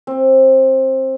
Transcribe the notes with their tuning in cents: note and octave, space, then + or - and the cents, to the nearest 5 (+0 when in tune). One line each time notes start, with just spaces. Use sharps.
C4 +20